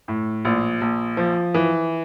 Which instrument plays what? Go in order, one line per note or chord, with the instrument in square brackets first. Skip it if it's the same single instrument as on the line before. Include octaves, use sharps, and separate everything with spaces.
[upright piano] A2
A#1
A#1
F3
E3